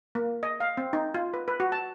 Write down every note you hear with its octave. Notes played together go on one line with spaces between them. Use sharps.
A#3
D#5
F5
C4
D#4
F4
B4
B4
F#4
A5